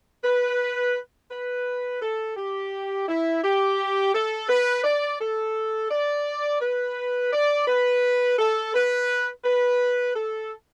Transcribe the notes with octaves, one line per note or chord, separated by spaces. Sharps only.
B4
B4
A4
G4
E4
G4
A4
B4
D5
A4
D5
B4
D5
B4
A4
B4
B4
A4